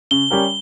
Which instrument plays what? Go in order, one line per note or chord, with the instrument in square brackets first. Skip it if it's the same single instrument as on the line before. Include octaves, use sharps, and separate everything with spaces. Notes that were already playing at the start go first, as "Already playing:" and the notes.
[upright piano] C#3 [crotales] G7
[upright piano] G3 C#4 G4 A#4